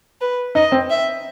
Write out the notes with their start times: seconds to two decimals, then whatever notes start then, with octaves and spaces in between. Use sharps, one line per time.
0.21 B4
0.55 D#4 D#5
0.72 C4
0.90 E5